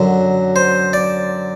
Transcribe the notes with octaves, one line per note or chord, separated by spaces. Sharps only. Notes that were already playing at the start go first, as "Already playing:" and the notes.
Already playing: F#2 D3 F#3
C5
D5